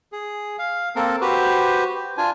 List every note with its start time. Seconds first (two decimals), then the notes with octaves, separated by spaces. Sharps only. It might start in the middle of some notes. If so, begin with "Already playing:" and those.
0.12 G#4
0.59 F5
0.96 A#3 C4 A4 A#4
1.21 F#4 G4 B4 C5
2.17 D4 F4 G#5